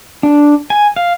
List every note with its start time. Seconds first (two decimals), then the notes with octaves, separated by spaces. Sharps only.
0.23 D4
0.70 G#5
0.96 F5